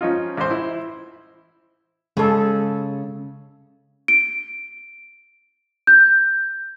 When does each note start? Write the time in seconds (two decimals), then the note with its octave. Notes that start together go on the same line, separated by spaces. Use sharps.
0.01 F3 C#4 D#4 F4
0.37 A1 C5
0.51 E4
2.17 C#3 G#3 A4
4.08 D7
5.87 G6